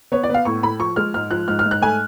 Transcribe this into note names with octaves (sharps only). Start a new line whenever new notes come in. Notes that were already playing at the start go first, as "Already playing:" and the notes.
B3 C#5
D5
B3 F5
A2 C#6
A2 B5
F3 C#6
G#3 F6
G#2 F6
F3 F#6
G#2 F6
F6
G#2
F#6
A3 G#5